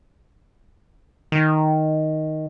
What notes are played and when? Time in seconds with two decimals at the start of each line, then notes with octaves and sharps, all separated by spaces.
1.32 D#3